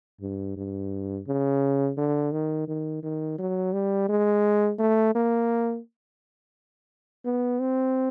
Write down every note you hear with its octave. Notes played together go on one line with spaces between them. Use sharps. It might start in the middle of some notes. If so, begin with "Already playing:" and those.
G2
G2
C#3
D3
D#3
D#3
D#3
F#3
G3
G#3
A3
A#3
B3
C4